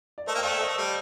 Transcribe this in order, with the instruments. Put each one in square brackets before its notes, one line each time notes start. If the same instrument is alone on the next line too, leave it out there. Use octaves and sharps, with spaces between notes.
[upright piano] D5
[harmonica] A3 [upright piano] C5 D#5
[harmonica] A#3
[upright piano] G5
[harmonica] A3 [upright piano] D5 F5
[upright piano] C5 D#5
[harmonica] A3
G3